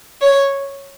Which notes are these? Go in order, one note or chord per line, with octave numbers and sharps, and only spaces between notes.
C#5